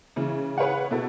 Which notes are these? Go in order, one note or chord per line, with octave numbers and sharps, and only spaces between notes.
C#3 E3
G#4 B4 C#5 F5 F#5
B2 E4 A4